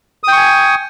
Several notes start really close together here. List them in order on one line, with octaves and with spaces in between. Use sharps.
D#6 G5 C#6 G#5